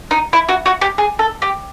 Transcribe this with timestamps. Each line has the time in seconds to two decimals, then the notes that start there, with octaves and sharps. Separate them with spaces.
0.11 D#4
0.33 E4
0.49 F#4
0.66 F#4
0.81 G4
0.98 G#4
1.19 A4
1.42 G4